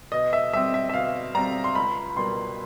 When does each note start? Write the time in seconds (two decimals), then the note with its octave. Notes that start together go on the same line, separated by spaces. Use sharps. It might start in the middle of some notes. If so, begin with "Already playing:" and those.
0.12 B2 D#5
0.33 E5
0.53 G3 C4 E5
0.74 E5
0.89 E5
0.94 B2 F5
1.35 G3 C4 A#5
1.64 C6
1.75 C#2 B5
2.17 B2 G3 A#3 C6